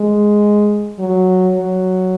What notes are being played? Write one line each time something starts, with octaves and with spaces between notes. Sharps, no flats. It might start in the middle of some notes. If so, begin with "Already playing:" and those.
Already playing: G#3
F#3
F#3